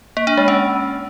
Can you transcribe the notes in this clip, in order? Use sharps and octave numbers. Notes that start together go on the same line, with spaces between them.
A#3
D4
G#3
C#4